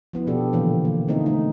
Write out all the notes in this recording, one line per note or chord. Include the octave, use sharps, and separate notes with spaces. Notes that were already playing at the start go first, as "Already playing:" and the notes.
F3 B3 E4
B2 D4 G4 A4
A#2 D3 E3 F3 A#3
A#3
D3 A3 C4 D#4
D#4